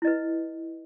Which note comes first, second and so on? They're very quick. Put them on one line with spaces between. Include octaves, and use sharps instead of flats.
E4 D#5 B4